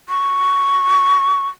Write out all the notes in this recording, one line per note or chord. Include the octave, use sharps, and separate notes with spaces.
C#6